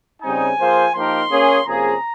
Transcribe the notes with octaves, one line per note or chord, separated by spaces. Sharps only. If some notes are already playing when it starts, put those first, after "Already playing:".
C#3 G3 C4 D#4 G#5
F3 A#3 F4 G#4 C5
F3 A#3 D#4 G4 A#4 C6
A#3 C#4 G#4
C3 F3 A#3 C#4 G#4 A#5